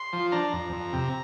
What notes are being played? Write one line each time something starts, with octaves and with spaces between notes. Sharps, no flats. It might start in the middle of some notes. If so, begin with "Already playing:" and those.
Already playing: C6
F3
D4 A#5
F2
F2
C3